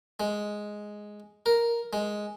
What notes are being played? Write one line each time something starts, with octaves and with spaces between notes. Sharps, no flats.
G#3
A#4
G#3